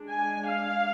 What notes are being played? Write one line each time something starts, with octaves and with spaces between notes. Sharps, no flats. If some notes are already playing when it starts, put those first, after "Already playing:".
Already playing: G#3 D4
G#5
F5